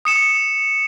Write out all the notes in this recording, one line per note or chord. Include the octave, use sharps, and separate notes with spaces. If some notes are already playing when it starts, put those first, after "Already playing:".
D#6 C#7 E7